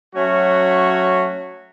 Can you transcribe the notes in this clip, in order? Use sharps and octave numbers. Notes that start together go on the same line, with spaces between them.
F#3 A3 C#4 F#4